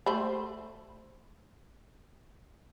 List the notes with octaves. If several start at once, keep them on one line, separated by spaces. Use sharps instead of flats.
A3 C5 B5